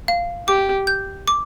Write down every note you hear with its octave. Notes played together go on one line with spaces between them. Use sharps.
F5
G4 D6
G6
D6